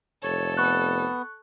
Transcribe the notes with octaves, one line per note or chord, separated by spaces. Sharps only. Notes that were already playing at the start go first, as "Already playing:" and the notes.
F1 A4 C#5
B3 C#6 F#6